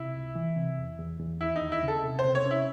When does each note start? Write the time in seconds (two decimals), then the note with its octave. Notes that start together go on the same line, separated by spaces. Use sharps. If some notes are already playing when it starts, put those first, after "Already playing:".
Already playing: C3 E4
0.15 C#2
0.35 E3
0.56 C3
0.78 E2
0.99 E2
1.20 E2
1.41 D#2 E4
1.56 D#4
1.62 D#2
1.72 E4
1.83 C#3
1.88 A4
2.04 C3
2.19 C5
2.25 C3
2.35 C#5
2.46 C#4 E4